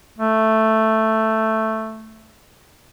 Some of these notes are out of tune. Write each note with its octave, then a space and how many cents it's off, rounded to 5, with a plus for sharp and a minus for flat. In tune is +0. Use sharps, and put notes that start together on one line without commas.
A3 +5